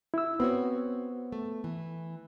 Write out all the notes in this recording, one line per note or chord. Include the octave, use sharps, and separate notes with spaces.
E4 E6
B3 C4 F#4 C#5
A3
E3